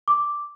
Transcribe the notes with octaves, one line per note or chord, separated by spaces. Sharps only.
D6